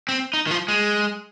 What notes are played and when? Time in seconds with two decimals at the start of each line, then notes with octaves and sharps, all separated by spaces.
0.09 C4
0.33 D#4
0.47 D#3
0.51 F3
0.68 G#3